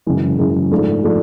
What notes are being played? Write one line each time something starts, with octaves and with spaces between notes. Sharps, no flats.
F#2 C#3 E3 G#3
F#2 C#3 E3 G#3
G#2 F3 A3 D4
F3 A3 D4